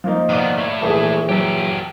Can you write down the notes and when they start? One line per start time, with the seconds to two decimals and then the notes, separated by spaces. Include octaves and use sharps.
0.04 F3 A#3 D#4
0.29 D#3 B3 D5 F5
0.58 A3 C#5
0.82 A#1 E3 G#4 A4
1.29 F#3 G4 A4